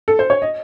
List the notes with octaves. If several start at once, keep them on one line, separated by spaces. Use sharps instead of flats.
A4
C5
C#5
D#5